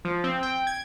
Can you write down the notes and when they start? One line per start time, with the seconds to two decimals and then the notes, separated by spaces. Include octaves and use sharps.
0.05 F3
0.24 C4
0.43 G5
0.67 G#6